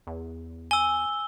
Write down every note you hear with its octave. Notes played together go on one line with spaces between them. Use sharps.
E2
G#5 E6 G7